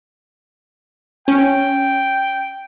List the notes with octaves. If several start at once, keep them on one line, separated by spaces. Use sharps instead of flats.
C#4 G5